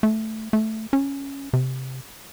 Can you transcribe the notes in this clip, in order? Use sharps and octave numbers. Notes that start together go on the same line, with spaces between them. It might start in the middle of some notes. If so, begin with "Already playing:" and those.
A3
A3
C#4
C3